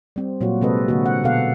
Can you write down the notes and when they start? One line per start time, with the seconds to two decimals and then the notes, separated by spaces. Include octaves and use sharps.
0.16 G3 C4
0.41 A#2 F#3 A#3 F4 F#4
0.61 C3 G#3 C4 A4 B4 D#5
0.88 D3 A#3 C4 F#4
1.06 F#5
1.24 B2 B3 A4 F5 F#5